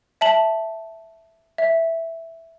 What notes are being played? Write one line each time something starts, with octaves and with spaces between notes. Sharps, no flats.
E5 A5 F#7
E5